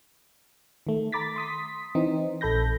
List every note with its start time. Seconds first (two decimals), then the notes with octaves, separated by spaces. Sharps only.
0.87 D#3 A3
1.12 A#5 B5 D6 A6 B6
1.36 C6 D#6 B6
1.95 E3 C4 D#4
2.41 A#1 A4 B5 G6 A#6